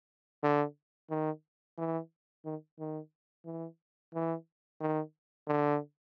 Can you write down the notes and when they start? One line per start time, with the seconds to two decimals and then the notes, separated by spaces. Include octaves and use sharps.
0.43 D3
1.10 D#3
1.78 E3
2.45 D#3
2.79 D#3
3.45 E3
4.14 E3
4.80 D#3
5.48 D3